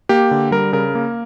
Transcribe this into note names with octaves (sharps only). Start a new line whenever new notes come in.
A#3 G4
D3
G3 A#4
C#3 A#4
A#3